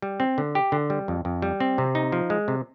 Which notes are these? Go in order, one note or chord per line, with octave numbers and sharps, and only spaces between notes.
G3
C4
D3
G4
D3
G3
F2
F2
G3
C4
C3
D#4
F3
G#3
C3